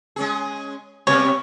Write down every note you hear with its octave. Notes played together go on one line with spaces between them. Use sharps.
G#3 C#4 G#4
C3 G3 B3 C#5